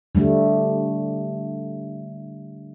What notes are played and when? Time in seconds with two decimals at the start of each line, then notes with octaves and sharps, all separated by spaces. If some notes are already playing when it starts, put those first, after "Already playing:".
0.15 D3 G3 A3